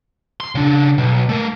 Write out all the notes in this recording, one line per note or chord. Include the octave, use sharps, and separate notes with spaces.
C6
C#3 D4
B1
A3 A#4